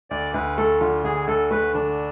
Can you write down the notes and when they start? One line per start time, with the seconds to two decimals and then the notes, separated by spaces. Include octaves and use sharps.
0.10 D2 D5
0.34 D2 B4
0.57 A3 A4
0.80 D3 F4
1.04 D2 G#4
1.27 D2 A4
1.51 A3 B4
1.74 D3 D4